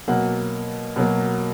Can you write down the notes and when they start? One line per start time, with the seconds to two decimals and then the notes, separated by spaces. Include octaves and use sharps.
0.08 B2 F#3 A#3 F#5
0.96 B2 F#3 A#3